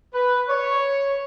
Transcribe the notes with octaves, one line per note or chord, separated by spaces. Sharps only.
B4
C#5